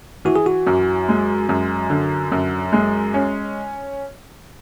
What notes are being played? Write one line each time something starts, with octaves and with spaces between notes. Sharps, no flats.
E3 F#4
G#4
F#4
F#2
G#3
F#2
D3
F#2
G#3
C#4